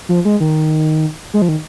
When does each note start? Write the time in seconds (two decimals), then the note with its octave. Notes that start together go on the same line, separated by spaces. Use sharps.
0.09 F3
0.25 G#3
0.40 D#3
1.34 G#3
1.42 F3
1.49 D#3